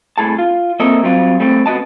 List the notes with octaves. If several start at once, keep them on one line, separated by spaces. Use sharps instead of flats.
C2 A2 G#4 A5
F4
A#3 C4 A4 D#5 E5
F#3 G3 C4 F4
G3 A3 C4
C#2 B3 F#4 D#5 A5